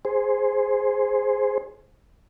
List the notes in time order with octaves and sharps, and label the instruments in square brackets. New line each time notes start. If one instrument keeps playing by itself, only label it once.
[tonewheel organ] G#4 C5